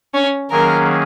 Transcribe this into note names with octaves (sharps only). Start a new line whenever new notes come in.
C#4
D#3 F#3 A#3 C#4 G#4 A#4